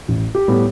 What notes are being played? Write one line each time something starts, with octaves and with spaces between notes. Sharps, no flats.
A1
G4
A2 G3 B3